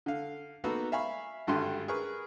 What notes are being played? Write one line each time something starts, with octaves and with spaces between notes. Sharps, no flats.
D3 F5
A#3 B3 D#4 F#4 A4 B4
E5 F5 G#5 B5 C#6
G#1 G2 D3 G3 C6
G#4 A#4 B4 C#6